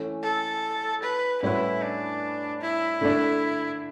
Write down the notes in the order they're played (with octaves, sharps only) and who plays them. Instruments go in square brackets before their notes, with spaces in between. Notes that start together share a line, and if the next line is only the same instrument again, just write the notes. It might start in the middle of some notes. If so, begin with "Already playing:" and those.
Already playing: [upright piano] E3 A3 C#4
[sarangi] A4
B4
[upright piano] A2 G3 C#4 F#4 B4 [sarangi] E4
[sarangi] D4
E4
[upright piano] D3 A3 D4